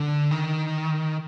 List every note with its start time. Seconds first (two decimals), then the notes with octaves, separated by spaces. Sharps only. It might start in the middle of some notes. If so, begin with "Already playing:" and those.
Already playing: D3
0.31 D#3